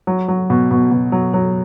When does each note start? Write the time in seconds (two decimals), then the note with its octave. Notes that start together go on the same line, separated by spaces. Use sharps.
0.07 F#3
0.28 F#3
0.50 B2
0.71 B2
0.91 B2
1.12 F#3
1.34 F#3